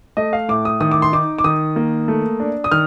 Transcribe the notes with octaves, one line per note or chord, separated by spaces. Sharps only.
A3 D#5
F5
A2 D6
D#6
D#3 D#6
D6
C6
D#4 D6
D6
D#3 D#6
A#3
A3
D4
D#6
D#3 F6